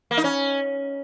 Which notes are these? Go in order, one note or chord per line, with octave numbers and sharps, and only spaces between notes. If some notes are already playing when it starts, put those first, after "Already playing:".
A#3
D#4
C#4